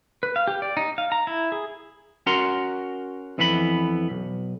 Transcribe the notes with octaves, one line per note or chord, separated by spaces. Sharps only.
B4
F5
G4
D5
D#4
F5
A#5
E4
G#4
C#4 F#4 A#4 F#5 A#5 C6
F2 E3 B3 A#4 B5
B1